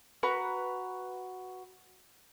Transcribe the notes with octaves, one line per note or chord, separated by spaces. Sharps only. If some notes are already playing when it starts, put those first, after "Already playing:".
F#4 B4 A#5 C#6